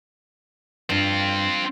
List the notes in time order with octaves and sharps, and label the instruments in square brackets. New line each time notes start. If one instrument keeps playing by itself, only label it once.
[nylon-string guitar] G2 [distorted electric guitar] C4 F4